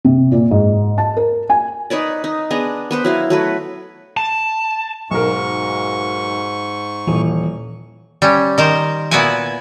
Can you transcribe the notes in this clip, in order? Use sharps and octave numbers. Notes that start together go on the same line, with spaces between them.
C3
A#2
G#2
A5
A#4
G#5
D#4 B4 C#5 D5
D#4
B3 D4 G#4 A#5
B3 B4 C5
F#3 E4 F5
F#3 A3 B4
A5
B1 G#2 A#4 C#6
D#1 E3
G3 C#4
D#3 A#4 C5
A#2 B3 E4 F#4 B4 G#5